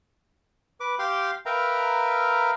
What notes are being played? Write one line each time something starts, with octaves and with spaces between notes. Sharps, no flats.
B4 D6
G4 F5 G5 C6 D6
A#4 B4 E5 F5 G5 A#5